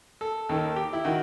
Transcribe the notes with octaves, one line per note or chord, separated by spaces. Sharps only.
A4
D#2 D#3 A4
G4
E4
D#3 F#4